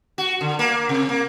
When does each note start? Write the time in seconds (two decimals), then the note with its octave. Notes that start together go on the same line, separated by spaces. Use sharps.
0.18 F#4
0.41 D3
0.59 A#3
0.89 C3
1.09 A#3